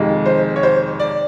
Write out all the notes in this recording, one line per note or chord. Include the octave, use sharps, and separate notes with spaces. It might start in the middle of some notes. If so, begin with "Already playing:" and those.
Already playing: F2 C3 D#3 G#3
C5
C#5
C5
D5